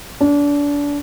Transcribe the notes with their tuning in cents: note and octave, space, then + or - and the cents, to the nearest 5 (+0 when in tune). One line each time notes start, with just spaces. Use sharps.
D4 -30